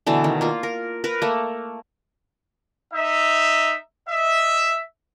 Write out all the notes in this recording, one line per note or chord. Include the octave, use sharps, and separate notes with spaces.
B2 D3 E3 A3
D#3
A#3 F4
A#4
A#4 B4
A3 A#3
D#4 E5
D#5 E5